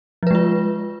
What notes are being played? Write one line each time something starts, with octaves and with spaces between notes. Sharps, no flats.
F3 G#3 F4 B4